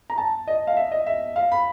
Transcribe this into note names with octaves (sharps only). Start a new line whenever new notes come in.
A#5
A5
D#5
F5
E5
D#5
E5
F5
B5